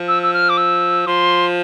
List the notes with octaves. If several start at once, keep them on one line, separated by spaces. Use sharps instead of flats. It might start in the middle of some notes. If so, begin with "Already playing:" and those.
Already playing: F3
E6
E6
F6
D6
E6
F3 C6